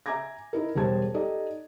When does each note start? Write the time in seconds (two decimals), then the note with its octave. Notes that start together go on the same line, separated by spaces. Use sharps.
0.06 E5 G#5 A#5 D6 G#6 A#6
0.53 D#4 E4 A#4
0.75 E1 G3 G#4 C5 A5 G#6
1.14 D#4 G4 A4 D5 D#5